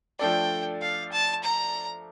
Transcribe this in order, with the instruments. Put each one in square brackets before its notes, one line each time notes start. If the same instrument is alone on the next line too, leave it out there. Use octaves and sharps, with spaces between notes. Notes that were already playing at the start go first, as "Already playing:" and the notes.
[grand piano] F3 A3 D4 A4 D5 [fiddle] G5
[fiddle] F5
A5
A#5